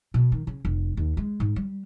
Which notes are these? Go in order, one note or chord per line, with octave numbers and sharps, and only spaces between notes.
B2
D#3
C#3
F1
D#2
G#3
G#2
G3